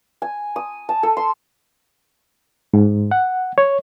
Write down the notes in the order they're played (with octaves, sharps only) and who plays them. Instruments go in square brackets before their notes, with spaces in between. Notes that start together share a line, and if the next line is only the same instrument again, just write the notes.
[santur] G#5
D#6
A5
A4
C6
[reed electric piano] G#2
F#5
C#5